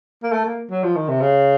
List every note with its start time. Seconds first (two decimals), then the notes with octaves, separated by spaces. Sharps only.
0.23 A#3
0.32 A3
0.45 A#3
0.71 F#3
0.83 F3
0.96 D#3
1.08 C3
1.21 C#3